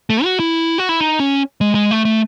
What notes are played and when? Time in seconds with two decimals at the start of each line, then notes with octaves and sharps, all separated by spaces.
0.10 A3
0.24 F#4
0.40 E4
0.78 F#4
0.89 E4
1.00 D#4
1.20 C#4
1.61 G#3
1.75 G#3
1.91 A3
2.05 A3